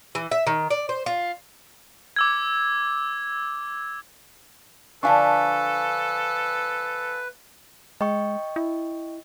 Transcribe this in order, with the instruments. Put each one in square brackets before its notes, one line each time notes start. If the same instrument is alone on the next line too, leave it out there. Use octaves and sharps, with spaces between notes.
[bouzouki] E3
E5
D#3
D5
C5
F4
[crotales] D6 E6 G#6
[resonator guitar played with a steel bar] D3 F3 D4 [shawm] A4 [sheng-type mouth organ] B4 [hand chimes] F5 G#5 C#6
[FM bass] G#3 [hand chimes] D#5 G5 C#6
[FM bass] E4